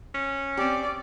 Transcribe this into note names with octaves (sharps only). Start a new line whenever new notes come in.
C#4
C4 G4 D5